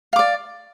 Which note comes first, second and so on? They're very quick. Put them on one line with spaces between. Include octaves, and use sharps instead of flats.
F5 D6 D5